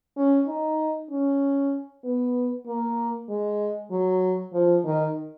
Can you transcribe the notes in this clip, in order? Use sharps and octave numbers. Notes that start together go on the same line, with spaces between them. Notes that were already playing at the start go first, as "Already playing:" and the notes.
C#4
D#4
C#4
B3
A#3
G#3
F#3
F3
D#3